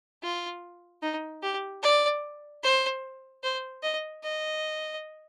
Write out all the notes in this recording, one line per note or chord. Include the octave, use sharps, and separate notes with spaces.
F4
D#4
G4
D5
C5
C5
D#5
D#5